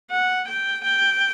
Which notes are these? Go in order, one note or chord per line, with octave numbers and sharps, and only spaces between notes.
F#5
G5
G5